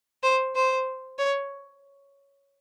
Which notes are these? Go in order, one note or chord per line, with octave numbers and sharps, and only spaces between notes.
C5
C5
C#5